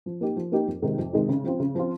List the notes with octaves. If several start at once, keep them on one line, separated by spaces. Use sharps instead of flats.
F3
A#3 D#4 G4
F3
A#3 D#4 G4
F2
C3 D#3 G#3 D#4
F2
C3 D#3 G#3 D#4
C#3
F3 C4 F4
C#3
F3 C4 F4